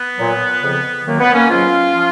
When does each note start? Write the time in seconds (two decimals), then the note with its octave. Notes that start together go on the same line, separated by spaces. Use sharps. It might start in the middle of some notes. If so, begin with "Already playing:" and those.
Already playing: B3
0.17 A#2 F#3
0.61 F2 C#3 F3
1.05 F#2 D#3 F#3 A#3
1.19 B3
1.33 A#3 C#4
1.48 G#2 F#3 C#4 F4
1.94 F3